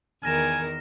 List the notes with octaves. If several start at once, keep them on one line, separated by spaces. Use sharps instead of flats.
E2 D#3 A#4 G#5 F6 A#6 E7